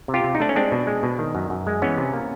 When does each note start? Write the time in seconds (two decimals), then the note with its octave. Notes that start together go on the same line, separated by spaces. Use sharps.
0.08 C3
0.14 F4 G4
0.24 C3
0.35 D#4
0.40 A3 D4
0.49 C#4
0.56 G#3 C4 D4
0.72 B2
0.87 G#3
1.03 B2
1.19 D#3
1.35 F#2
1.50 F#2
1.67 G#3
1.82 E3 B3 C#4
1.98 C3
2.14 A#3